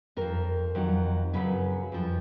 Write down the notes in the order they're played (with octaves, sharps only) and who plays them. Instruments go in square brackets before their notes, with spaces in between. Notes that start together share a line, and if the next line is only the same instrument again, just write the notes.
[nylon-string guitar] F2 F3 A#4
F2 D#3 F#3
F#2 C#3 F#3 B4
F2 F3